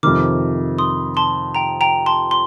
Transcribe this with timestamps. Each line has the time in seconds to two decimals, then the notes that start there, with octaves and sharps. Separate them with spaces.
0.03 F2 C3 D#3 D6 F6
0.78 C6 D#6
1.17 A5 C6
1.55 G5 A#5
1.81 G5 A#5
2.06 A5 C6
2.31 C6